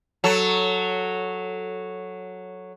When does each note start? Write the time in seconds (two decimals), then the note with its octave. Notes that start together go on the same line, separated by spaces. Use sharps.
0.24 F#3 A4